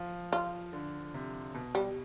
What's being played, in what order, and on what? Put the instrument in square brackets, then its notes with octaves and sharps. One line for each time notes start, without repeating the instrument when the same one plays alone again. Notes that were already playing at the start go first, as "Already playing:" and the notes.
Already playing: [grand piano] F3
[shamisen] F4
[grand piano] D3
C3
B2
[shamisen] G3